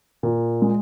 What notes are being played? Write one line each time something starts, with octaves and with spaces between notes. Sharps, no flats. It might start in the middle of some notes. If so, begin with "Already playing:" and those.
A#2
G#3